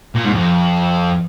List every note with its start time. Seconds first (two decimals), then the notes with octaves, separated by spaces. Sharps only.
0.15 A#2
0.25 G#2
0.34 F2